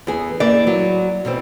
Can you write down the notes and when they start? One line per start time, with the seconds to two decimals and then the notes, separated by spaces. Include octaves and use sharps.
0.07 E2 G#4
0.40 E3 A#3 D5
0.67 F#3
1.25 B2 E3 C4